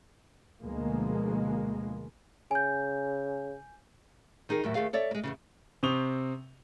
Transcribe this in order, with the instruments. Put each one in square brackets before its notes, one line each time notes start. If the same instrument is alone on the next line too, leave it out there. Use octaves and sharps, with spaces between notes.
[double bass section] D2 B2 F3 G#3 A#3
[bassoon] C#3 [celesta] G#5 G6
[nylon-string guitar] D#3 D#4 G#4 A#4
D#2 A2 F#3 E5
D#2 A3 G#4 F5
A4 C#5 D5 E5
G#3 A#3
E2 G2 C#3
[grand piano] C3 C4 C#6 D#6 F7 G7